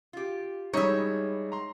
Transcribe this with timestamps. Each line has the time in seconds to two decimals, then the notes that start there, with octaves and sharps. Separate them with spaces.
0.13 F4 G4
0.73 G3 G#3 D#4 E4 C#5 E5
1.52 A#5 C6